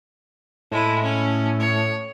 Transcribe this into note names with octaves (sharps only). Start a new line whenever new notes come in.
A2 G#3 E4
C#4
C#5